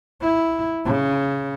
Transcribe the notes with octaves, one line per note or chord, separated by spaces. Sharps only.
E4
C#3